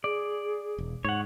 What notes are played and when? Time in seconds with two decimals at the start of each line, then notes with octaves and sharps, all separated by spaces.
0.04 G#4 D5
0.78 E1
1.05 G#2 C#5 F#5